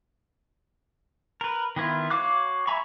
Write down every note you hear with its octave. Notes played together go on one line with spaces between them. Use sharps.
A#4 B4
D#3 B3 E4 F4
F#4 C#5 F5 D6 F#6
E5 G#5 A#5 B5 C#6